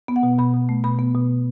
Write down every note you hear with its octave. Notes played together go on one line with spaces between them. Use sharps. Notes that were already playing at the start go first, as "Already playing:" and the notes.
B3
F#5
B2
B2 B5
B2
A3
B2 B5
B3
B2